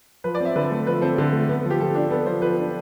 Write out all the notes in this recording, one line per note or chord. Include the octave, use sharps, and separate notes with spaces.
F3 B4
D5
C4 E5
D3 B4
A3 A4
F3 B4
C4 A4
D3
A3
B3
F3
G4
F3 A4
D4
B3 A4
F3 C5
F3 B4
D4